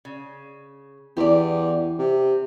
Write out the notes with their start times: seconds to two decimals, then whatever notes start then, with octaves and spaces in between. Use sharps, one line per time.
0.05 C#3
1.17 E2 G4 D5
1.98 C3